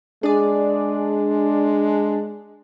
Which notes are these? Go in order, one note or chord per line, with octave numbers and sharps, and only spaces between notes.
G#3 D4 G#4 D5